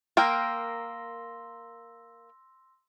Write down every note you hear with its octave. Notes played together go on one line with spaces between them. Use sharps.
A#3 A#4 G5 C6 E6 A#6